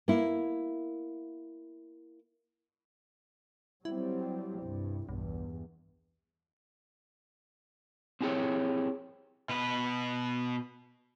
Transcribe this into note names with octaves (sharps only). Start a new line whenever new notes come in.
A#3 E4
F#3 G3 C4 E4
C2 G2
B1 E2 G2
C4 E4 G4 G#4 C#5
B2 B4